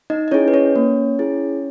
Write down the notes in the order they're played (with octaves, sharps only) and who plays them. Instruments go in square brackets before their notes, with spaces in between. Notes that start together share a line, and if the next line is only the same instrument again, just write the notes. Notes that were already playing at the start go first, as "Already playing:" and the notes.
[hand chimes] D#4 D#5
D#5
C#4 E4 G#4 C#5
B4
C#4 C#5
A#3
E4 G#4